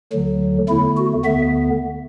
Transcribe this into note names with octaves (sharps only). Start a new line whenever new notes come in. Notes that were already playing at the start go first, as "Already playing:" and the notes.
D2 D3 F#3
E2 D3 A3 E4
F#4
D2 D3 B3 E5